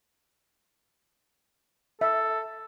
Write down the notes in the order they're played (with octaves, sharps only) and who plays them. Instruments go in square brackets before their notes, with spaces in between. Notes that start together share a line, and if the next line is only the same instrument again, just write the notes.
[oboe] A4 [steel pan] E5